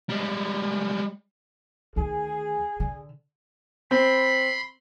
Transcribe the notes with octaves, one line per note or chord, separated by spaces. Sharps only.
G3 G#3
D2 D#3 G#4
D3
C4 B5 C6